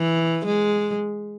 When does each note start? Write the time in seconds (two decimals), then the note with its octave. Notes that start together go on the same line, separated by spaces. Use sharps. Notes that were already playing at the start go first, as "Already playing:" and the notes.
Already playing: E3
0.46 G#3